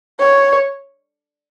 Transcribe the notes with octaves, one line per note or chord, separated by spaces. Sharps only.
C#5